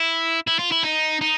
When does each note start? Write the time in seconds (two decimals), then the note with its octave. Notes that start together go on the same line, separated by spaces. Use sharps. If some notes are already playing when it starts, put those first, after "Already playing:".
Already playing: E4
0.47 E4
0.59 F4
0.72 E4
0.84 D#4
1.21 D#4